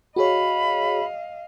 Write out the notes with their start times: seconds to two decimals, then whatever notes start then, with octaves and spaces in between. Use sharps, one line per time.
0.16 F#4 G#4 C#5 D#5 F5 B5